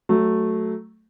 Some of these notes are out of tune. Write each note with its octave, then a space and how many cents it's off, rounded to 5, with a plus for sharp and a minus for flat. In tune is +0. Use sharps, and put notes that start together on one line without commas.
F#3 +10 A3 +0